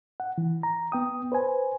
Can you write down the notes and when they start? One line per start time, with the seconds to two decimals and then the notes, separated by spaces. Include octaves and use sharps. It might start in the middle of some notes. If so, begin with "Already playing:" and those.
0.20 F#5
0.38 E3
0.63 A#5
0.92 B3 G5 D#6
1.32 B4 C5 G#5